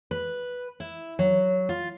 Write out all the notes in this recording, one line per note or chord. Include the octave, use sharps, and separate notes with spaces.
B4
E4
F#3
F4